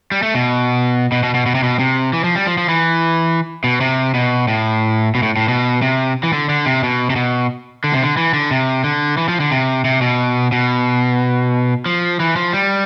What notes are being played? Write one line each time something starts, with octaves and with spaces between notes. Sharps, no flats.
G3
A3
B2
B2
B2
B2
B2
C3
B2
C3
E3
F3
G3
F3
F3
E3
B2
C3
B2
A2
B2
A2
A2
B2
C3
E3
D3
D3
C3
B2
C3
B2
D3
C3
D3
E3
D3
C3
D3
E3
F3
D3
C3
C3
B2
B2
F3
E3
F3
G3